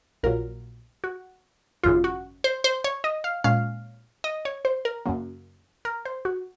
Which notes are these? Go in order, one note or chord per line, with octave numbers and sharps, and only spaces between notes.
A#1 A#2 F#3 A#4
F#4
G#1 F#2 C#3 F4
F#4
C5
C5
C#5
D#5
F5
A#2 G#3 C#4 F5
D#5
C#5
C5
A#4
F#2 C#3 F#3 A#3
A#4
C5
F#4